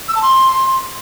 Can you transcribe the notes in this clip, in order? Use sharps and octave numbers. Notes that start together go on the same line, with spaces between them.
E6
A5
C6